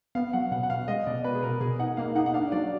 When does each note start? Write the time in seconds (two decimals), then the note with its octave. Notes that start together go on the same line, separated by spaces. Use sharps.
0.15 B3 F5
0.33 F#3 F#5
0.51 B2 F#5
0.63 F#5
0.70 B2 F5
0.88 G#3 D#5
1.07 B2 D5
1.24 B2 B4
1.35 G#4
1.43 B2 A#4
1.61 B2 G#4
1.79 D#4 F#5
1.97 A#3 F5
2.15 D#4 F#5
2.26 F#5
2.34 D4 F5
2.52 F#3 D5